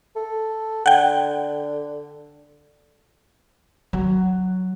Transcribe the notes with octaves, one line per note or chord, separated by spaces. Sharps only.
A4
D3 F#5 G5
F#3